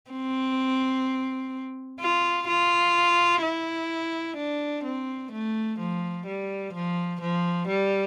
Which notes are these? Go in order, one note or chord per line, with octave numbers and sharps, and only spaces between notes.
C4
F4
F4
E4
D4
C4
A3
F3
G3
F3
F3
G3